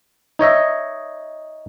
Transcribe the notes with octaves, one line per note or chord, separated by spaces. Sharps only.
D#4 C#5 D#5 E5